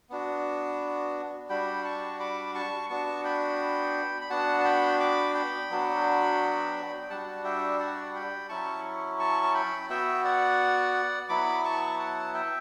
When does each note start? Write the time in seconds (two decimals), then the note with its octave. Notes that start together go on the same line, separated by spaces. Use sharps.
0.10 B3 D4 F#4
1.49 G3 D4 F#4 G5 B5
1.85 A5 C#6
2.20 B5 D6
2.55 A5 C#6
2.90 B3 D4 F#4 A5 C#6
3.24 G5 B5
4.21 B5
4.30 B3 D4 F#4 F#5 A5
4.60 A5
4.64 G5 B5
5.00 B5 D6
5.34 G5 B5
5.70 F#3 B3 D4 F#4
7.02 G5
7.10 G3 D4 F#4 F#5 A5
7.44 E5 G5
7.79 D5 F#5
8.15 G5 B5
8.49 F#3 C#4 E4 A5 C#6
9.19 A5 C#6
9.43 A5
9.54 G5 B5
9.90 B3 F#4 E5 G5
10.24 D5 F#5
11.29 F#3 B3 E4 B5 D6
11.64 A5 C#6
11.99 F#5 A5
12.34 E5 G5